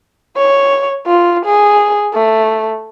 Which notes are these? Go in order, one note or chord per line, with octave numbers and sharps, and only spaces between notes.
C#5
F4
G#4
A3